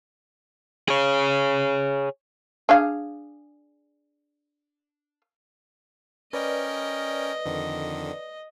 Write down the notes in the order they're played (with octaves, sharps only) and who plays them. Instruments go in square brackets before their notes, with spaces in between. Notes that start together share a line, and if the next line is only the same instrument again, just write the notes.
[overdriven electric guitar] G#4 C#5
[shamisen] D4 G#4 F5
[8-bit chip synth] C#4 A#4 G5 [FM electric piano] B4 D5 [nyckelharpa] D#5
[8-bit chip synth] F2 D3 D#3